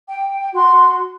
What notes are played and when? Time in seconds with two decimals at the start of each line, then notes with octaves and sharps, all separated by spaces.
0.07 G5
0.53 F#4 C6